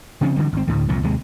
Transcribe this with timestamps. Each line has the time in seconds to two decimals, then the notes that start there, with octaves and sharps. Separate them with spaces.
0.21 C#3 F3 C4 C#4
0.36 D3 E3 G3
0.53 G#1 C4
0.67 D2 A2 D3
0.89 C2 F2 A#2 F3
1.03 D#2 C3 G#3